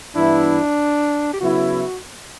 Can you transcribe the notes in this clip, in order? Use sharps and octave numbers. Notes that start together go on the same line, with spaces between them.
G2 E3 B3 D4 E4
G4
C#3 F#3 B3 E4 F#4